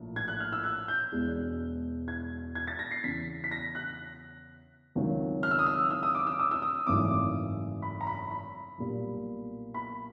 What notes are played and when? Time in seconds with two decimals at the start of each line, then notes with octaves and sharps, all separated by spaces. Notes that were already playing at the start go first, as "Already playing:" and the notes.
Already playing: A#1 A2
0.16 G#6
0.28 F#6
0.40 F6
0.53 E6
0.64 F#6
0.88 G6
1.12 E1 E2 B2 G#3
2.08 G#6
2.55 G#6
2.67 A6
2.79 A#6
2.91 C7
3.04 E2 C#3 E3 B6
3.44 B6
3.51 A#6
3.75 F#6
4.95 C#2 C3 D#3 F#3
5.43 F6
5.51 E6
5.59 D#6
5.66 E6
5.90 E6
6.03 D#6
6.15 D6
6.27 E6
6.39 D#6
6.51 E6
6.62 D#6
6.87 G#1 F#2 C#3 E3 A3 D6
7.82 B5
8.01 A#5
8.07 B5
8.31 B5
8.78 B1 A#2 G3
9.74 B5